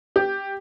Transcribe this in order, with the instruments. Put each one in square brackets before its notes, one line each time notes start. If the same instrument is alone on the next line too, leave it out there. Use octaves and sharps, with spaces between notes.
[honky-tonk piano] G4